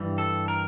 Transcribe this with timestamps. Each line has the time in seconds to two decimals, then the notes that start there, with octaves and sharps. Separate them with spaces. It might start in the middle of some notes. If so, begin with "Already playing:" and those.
Already playing: G2 E3 G3
0.18 A4
0.48 A#4